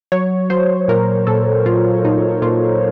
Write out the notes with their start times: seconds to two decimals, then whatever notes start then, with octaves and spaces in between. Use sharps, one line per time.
0.12 F#3 C#5
0.50 F#3 C5
0.88 A#2 A#4
1.27 A#2 A4
1.66 A#2 F4
2.04 A#2 D#4
2.42 A#2 F4